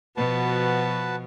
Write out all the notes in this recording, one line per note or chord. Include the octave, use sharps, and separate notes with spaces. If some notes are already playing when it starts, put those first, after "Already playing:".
B2 F3 F#4 B4 A5